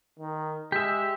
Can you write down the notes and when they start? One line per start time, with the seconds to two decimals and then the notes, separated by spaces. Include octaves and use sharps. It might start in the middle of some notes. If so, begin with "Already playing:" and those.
0.19 D#3
0.72 G#3 G4 E5